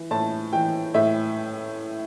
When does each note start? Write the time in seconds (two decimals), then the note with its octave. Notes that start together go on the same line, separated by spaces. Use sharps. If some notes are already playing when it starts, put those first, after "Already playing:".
Already playing: E3
0.11 A2 A5
0.53 E3 G5
0.94 A2 E5